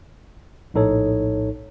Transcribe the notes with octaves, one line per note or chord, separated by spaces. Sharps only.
A#1 A2 D#4 A4 C#5